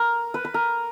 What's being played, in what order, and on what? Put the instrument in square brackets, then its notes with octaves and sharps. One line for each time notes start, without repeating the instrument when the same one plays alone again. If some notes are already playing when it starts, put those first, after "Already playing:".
Already playing: [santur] A#4
B4
B4
A#4